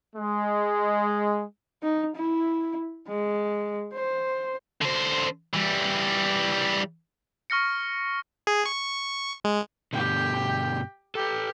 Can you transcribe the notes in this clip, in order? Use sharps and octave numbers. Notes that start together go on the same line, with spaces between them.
G#3
D#4
E4
G#3
C5
D3 C5
E3 G3
C#6 F6 A#6 C#7
G#4
C#6
G#3
G2 B2 D3 G4 G5
G4 A4 B4